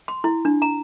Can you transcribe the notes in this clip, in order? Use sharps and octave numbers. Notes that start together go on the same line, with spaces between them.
C6
E4
D4
A#5